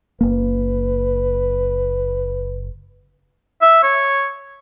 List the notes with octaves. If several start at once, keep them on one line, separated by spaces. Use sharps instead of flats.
F#1 A#3 B4
E5
C#5